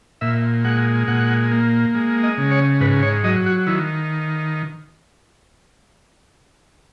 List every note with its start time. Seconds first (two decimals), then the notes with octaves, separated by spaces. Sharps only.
0.21 A#2 E5
0.64 G#3 F#5
1.08 A#2 F#5
1.52 A#3
1.95 G#3
2.23 D#5
2.38 C#3
2.51 C#5
2.81 G#2 B4
3.02 C#5
3.24 F#3 D#5
3.46 F#4
3.67 D#3 E4